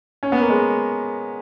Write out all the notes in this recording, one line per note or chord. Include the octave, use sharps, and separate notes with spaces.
C#4
B3
A#3
G#3